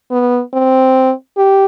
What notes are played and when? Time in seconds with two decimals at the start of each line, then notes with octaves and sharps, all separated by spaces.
0.11 B3
0.54 C4
1.37 G4